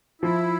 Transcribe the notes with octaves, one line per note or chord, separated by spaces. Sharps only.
F3 E4